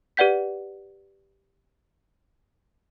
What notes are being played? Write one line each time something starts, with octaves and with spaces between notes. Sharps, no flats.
G4 B4 D5 F#5 G6 B6